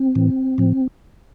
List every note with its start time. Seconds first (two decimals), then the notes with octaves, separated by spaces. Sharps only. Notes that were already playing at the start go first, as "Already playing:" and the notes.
Already playing: C4
0.15 A2 E3
0.58 A2 F3